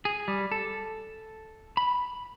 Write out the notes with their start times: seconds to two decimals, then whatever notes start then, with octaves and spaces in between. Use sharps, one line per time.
0.05 G#4
0.28 G3
0.52 A4
1.77 B5